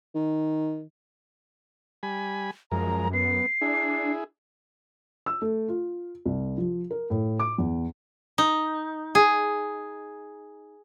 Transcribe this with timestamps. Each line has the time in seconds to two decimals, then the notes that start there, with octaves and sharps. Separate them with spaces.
0.15 D#3
2.03 G3 G#5 B5
2.72 F#2 F3 G#3 A#4 A#5
3.13 B3 C7
3.61 D4 E4 G#4
5.26 E6
5.42 A3
5.68 F4
6.26 C2
6.58 F3
6.91 A#4
7.10 A2
7.39 D6
7.58 E2
8.38 D#4
9.15 G#4